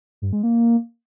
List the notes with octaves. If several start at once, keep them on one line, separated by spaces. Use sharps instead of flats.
G2
G#3
A#3